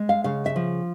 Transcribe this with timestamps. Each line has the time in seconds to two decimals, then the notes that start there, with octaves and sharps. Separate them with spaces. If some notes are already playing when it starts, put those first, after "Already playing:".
Already playing: G#3
0.09 F5
0.24 C#3 F5
0.46 E5
0.56 F3